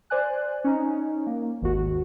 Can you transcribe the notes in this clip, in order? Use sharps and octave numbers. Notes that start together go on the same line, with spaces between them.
C5 D5 G#5 F#6
C#4 D#4
A#3
G#1 D#2 F#4